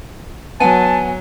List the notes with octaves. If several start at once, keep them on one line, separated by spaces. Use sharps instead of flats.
F#3 B3 G#5 A5